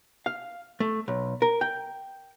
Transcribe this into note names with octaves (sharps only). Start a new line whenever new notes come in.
F5
A3
B1
A#4
G5